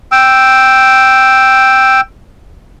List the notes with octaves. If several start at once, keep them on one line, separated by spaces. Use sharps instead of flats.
G5 E6